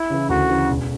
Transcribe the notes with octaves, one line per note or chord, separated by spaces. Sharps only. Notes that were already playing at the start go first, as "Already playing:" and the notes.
Already playing: E4
C#3 E3
D2 F#4
C#3 E3
E1